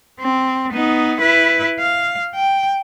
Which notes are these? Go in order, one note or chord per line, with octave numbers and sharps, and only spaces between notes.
C4
B3 D#4
E4 B4
F5
G5